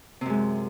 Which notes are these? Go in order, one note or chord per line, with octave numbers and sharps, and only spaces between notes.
F#2 C3 G#3